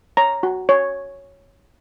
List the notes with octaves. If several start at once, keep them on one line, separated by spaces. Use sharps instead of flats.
C#5 A#5
F#4
C#5